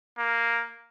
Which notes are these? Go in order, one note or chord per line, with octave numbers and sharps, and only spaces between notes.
A#3